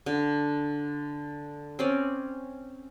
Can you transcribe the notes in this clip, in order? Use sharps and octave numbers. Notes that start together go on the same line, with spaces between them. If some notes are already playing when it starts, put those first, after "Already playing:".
D3
C4 C#4 D5